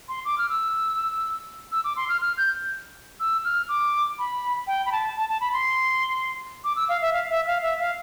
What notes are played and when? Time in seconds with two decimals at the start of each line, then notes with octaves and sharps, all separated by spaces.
0.08 C6
0.25 D6
0.38 F6
0.49 E6
1.72 E6
1.84 D6
1.96 C6
2.09 F6
2.21 F6
2.37 G6
3.20 E6
3.45 F6
3.69 D6
4.19 B5
4.67 G5
4.85 B5
4.92 A5
5.16 A5
5.29 A5
5.41 B5
5.53 C6
6.64 D6
6.76 E6
6.89 F5
7.01 E5
7.13 F5
7.30 E5
7.47 F5
7.62 E5
7.79 F5